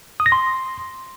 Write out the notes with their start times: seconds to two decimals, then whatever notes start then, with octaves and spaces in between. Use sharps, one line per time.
0.20 D#6
0.26 A#6
0.32 C6